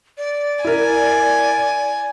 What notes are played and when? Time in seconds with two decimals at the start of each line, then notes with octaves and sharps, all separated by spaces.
0.17 D5
0.65 E4 A#4 G#5